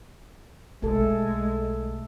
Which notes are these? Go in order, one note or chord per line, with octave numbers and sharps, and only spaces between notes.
B1 G#3 A3 A4